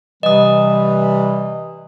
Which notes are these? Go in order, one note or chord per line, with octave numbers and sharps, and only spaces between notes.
C3 E3 G3 D#5 D#6